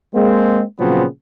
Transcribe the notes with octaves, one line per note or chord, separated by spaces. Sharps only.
G#3 A#3 C4
A#2 C#3 F3 F#3 B3 C4